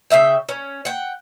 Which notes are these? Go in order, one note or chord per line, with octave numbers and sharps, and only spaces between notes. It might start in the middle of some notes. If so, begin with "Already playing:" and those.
C#3 C4 E5 G5
C#4
F#5 G5